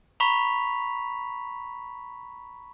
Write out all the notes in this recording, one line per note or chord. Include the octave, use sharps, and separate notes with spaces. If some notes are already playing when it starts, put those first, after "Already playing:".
A#5 B5 C#6 B6 F7